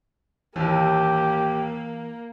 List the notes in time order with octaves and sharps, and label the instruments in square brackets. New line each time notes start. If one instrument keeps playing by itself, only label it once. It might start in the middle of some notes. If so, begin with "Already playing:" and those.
[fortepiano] A1 D#2 [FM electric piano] E3 [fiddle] A#3 [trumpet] G4